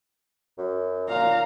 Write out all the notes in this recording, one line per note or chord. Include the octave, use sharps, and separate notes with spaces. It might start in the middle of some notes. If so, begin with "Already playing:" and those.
F#2
A#2 F5 A#5